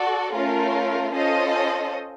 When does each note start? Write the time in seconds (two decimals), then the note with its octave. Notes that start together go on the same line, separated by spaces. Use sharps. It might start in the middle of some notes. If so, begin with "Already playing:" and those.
Already playing: F#4 A4 D5
0.33 A3 C#4 F4 A#4
1.12 C#4 F4 A4 C5 D#5